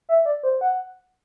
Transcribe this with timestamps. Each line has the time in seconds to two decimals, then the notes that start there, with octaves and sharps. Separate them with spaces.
0.09 E5
0.26 D5
0.43 C5
0.61 F#5